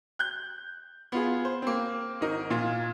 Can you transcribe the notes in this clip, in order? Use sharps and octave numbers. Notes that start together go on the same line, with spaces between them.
F#6 G6
B3 F4 G#4
C5
A#3 C4
G#1 D#4 A#4
A#2 F4